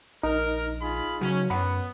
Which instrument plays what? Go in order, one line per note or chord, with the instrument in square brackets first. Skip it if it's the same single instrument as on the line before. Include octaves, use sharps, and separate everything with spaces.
[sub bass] A#1 [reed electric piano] D#4 [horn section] A#4
[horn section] F4 G#4 B5
[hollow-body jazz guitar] C#3 F#3 [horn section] C#4
[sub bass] F#2 [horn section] B3 [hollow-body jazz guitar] C#5 F#5 B5